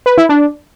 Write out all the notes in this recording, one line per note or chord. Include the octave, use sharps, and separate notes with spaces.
B4
E4
D4